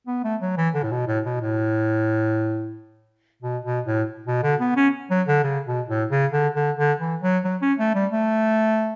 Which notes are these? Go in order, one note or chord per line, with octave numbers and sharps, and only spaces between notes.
B3
A3
F#3
E3
D3
A2
B2
A2
B2
A2
B2
B2
A2
B2
D3
B3
C#4
F#3
D3
C#3
B2
A2
C#3
D3
D3
D3
E3
F#3
F#3
C#4
A3
G3
A3